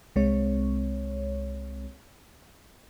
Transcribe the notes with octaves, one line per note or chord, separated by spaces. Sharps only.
C2 G#3 C4 C#5